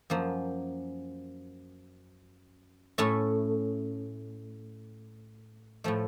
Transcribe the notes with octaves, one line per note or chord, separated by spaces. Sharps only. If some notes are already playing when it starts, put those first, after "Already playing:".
F#2 F3 A#3
A2 A3 C#4 A4
A2 F3 A3